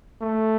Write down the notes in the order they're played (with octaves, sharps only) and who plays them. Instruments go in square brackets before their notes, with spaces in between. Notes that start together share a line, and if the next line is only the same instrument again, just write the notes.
[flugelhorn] A3